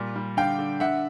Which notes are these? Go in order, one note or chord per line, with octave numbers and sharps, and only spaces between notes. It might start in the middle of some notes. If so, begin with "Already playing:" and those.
Already playing: A#2 G3
G3
D3 F5 G5
D3
D3 E5 F#5